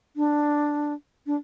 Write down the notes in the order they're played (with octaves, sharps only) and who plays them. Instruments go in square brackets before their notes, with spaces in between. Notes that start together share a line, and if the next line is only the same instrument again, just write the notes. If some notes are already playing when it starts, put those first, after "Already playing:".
[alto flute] D4
D4